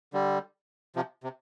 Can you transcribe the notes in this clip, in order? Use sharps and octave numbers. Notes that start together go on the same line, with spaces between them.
D3 G3
C3 F3
C3